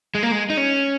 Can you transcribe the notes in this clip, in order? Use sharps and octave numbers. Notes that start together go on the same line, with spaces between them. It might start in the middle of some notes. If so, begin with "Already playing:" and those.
G#3
A#3
G#3
D#4
C#4